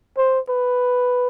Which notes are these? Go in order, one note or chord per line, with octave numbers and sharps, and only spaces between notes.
C5
B4